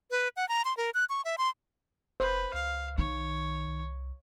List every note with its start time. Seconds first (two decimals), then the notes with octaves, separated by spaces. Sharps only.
0.11 B4
0.37 F#5
0.49 A#5
0.65 C6
0.77 A#4
0.94 F#6
1.09 C#6
1.25 E5
1.38 C6
2.20 F1 B4 C5
2.54 C#2 F5
2.98 B1 D#3 C#5
3.68 C2